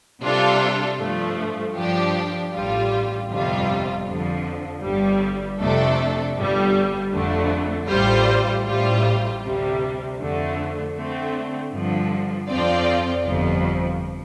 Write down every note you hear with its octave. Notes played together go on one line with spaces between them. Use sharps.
C3 G3 D4 F4 A4
G2 F3 A3
G2 F3 D4 G4
A1 G2 G3 F4
G1 F2 C3 G3 F4
F2 D3 F3
G1 G2 G3
F2 C3 A3 D4 A4
G1 G2 G3
F2 D3 A3
A1 A2 G3 F4 C5
A1 A2 G3 F4 C5
D2 C3 G3
F2 D3 A3
D3 A3 C4
G2 D3 F3
F2 F3 C4 F4 D5
G1 F2 F3